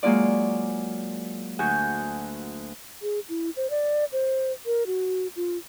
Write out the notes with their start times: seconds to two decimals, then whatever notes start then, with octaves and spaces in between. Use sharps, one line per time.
0.03 F#3 G#3 A#3 F4 D5
1.59 D2 F#4 G#5 G6
3.02 G#4
3.29 E4
3.56 C5
3.70 D5
4.12 C5
4.66 A#4
4.87 F#4
5.36 F4